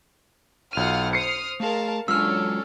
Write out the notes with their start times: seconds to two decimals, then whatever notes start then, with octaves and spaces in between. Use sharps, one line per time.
0.73 B1 F4 F#5 F6 D#7
1.13 C5 D#6 F6 C7 C#7
1.60 A3 G#4 A#4 F5 A5
2.08 F#3 G#3 C#4 D4 F4 A4 E6 F6